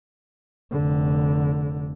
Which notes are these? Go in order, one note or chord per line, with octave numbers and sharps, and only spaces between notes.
F1 D3